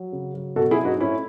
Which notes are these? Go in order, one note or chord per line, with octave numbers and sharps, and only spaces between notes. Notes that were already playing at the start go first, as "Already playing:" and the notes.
Already playing: F#3
C#3
F#3
B2 F#4 A4
E4 G#4
F#3
D#4 F#4
A2 C#4 E4